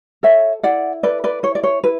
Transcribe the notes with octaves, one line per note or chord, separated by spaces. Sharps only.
A4 C#5 E5
E4 D5 F#5
A4 B4 D5
B4 D5
E4 C#5
D5
C#5
E4 B4